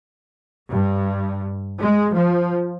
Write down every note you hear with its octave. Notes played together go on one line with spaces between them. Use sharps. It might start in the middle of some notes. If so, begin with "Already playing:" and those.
G2
G#3
F3